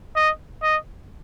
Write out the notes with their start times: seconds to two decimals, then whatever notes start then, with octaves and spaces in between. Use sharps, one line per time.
0.16 D#5
0.62 D#5